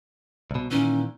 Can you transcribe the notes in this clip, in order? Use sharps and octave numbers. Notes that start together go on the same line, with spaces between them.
C2 B2
A#2 D#3 E3 C#4